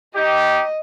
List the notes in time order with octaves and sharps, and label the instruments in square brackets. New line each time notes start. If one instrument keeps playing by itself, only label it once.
[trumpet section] D#4 G4 [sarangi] D#5